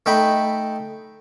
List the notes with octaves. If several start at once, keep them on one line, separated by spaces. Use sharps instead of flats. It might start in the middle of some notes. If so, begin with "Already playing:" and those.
A3 D#4 G5 B5